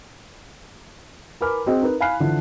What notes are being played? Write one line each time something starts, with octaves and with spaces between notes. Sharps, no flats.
A#4 B4 G#5 B5 D6 F6
C4 F#4 G#4 D#5
D#4 A#4 B4
F5 G#5 B5 F6 F#6 C7
D3 E3 F3